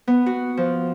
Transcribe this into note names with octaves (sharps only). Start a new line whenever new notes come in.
B3
F#4
F3